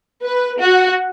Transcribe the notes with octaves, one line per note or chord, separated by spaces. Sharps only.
B4
F#4